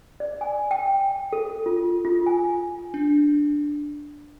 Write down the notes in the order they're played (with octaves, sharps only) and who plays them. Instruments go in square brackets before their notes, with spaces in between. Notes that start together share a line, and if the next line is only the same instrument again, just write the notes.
[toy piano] D5
G#5
G5
A4
F4
F4
G#5
[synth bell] D4